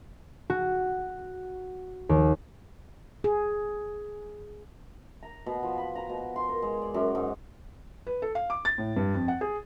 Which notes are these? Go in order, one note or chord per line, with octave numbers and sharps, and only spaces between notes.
F#4
D#2
G#4
A#5
B2
F3
B5
A#5
B2
C6
A#4
G#3
D5
F#2
G#2
B4
A4
F5
D6
A6
A2
G2
F2
F#5
G#4